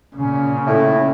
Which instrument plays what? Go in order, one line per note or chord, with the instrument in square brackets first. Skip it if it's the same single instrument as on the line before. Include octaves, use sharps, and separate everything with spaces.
[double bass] A#2 C#3 [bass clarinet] C#4
[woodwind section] A2